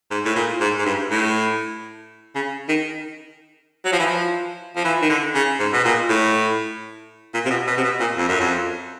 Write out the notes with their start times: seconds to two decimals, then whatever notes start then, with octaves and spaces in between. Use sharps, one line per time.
0.11 G#2
0.25 A2
0.36 A#2
0.61 G#2
0.78 G#2
0.85 G2
1.11 A2
2.35 C#3
2.69 D#3
3.85 F#3
3.92 F3
3.99 E3
4.06 F3
4.76 F3
4.85 E3
5.02 D#3
5.09 D3
5.35 C#3
5.60 G#2
5.73 B2
5.85 A#2
6.10 A2
7.34 A#2
7.45 C3
7.51 B2
7.67 B2
7.77 C3
7.84 B2
8.00 A#2
8.17 F2
8.29 F#2
8.40 F2